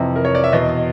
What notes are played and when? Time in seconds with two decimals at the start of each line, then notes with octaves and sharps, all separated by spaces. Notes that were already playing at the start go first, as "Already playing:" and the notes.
Already playing: F2 C3 E3
0.16 A#4
0.25 C#5
0.35 D5
0.44 E5
0.53 E2 B2 D#5